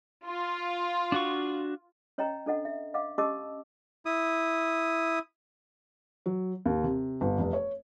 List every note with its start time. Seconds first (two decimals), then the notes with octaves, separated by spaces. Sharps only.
0.25 F4
1.12 D4 F#4 C#6
2.18 C#4 C#5 D#5 G5 A#5
2.46 D4 A4 D#5 F#5
2.65 E5
2.94 D#5 F5 F#5 D6
3.18 C#4 G4 D#5 A5 D6 E6
4.06 E4 D#6
6.26 F#3
6.66 D#2
6.84 C3
7.21 G1
7.39 F1
7.53 C#5